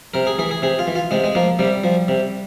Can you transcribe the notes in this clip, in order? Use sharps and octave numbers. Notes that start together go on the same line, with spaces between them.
C3 A#4
G#4
E3 G#4
G#4
C3 G#4
F4
E3
F4
C3 G#3
G#3
F3 A#3
C3 G3
F3
C3